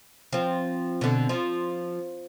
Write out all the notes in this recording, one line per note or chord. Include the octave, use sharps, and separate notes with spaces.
F3 C4
B2 D3
F3